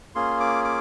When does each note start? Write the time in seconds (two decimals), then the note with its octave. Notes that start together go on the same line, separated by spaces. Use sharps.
0.15 A#3 C#4 F4 G#4 C6
0.40 D6
0.65 D6